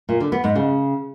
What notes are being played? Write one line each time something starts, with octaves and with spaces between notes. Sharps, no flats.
A#2
D3
B3
G#2
C#3